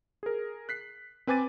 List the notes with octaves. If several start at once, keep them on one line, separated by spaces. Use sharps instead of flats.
G#4 A#4
F#6 B6 C7
C4 B4 G#5 D6 A6 D#7